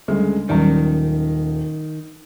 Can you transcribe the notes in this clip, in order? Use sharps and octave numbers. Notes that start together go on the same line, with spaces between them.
D2 C#3 G3 G#3
D#1 D#3 F#3 G3 C#4